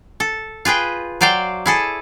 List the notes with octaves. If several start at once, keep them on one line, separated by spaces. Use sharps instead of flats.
A4
F4 G#4 B4 G5
F#3 C5 D5 F5 G5
E4 G#4 A4